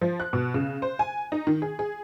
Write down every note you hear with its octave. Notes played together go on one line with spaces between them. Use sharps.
F3
F#6
B2
C#3
C5
G#5
D#4
D#3
G#4
G#4